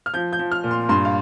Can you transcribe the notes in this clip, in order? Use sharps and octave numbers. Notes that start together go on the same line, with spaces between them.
F6
F3 G6
G6
F3
F6
A#2
C6
G2 C6
F5